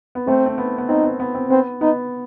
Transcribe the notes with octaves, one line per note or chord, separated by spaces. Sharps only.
B3
A3 C4
C4
B3
B3
C4 D#4
B3
B3
C4
B3 C4
B3 D#4